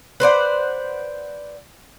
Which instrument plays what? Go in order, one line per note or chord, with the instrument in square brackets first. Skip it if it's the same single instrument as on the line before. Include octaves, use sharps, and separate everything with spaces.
[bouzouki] B4 C5 D5 F#5